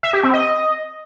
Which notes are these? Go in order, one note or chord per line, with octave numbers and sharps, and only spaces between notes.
E5
G4
C4
D#5